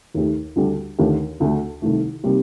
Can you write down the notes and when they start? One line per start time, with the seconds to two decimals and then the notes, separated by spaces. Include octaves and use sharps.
0.14 D#2 D#3 A3 D#4 G4
0.56 D2 D3 G3 D4 G4
0.98 D#2 D3 A3 D#4 G4
1.40 D2 D3 A3
1.82 C2 C3 D#3 A3
2.24 C3 G3 A#3 D#4 G4